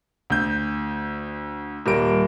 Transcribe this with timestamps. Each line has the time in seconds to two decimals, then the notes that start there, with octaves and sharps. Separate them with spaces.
0.30 D2 G6
1.86 D#1 G3 A#4 D7